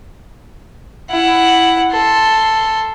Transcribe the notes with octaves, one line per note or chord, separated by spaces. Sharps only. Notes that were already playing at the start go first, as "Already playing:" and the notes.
E4 F#5
A4 C6